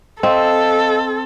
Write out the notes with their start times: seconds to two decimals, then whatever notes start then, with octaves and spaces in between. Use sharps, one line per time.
0.23 C4 A4 D#5 F5